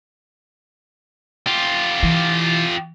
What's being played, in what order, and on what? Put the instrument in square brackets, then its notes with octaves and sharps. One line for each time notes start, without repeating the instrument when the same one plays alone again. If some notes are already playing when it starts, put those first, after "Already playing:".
[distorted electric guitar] F4 G4
[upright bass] E3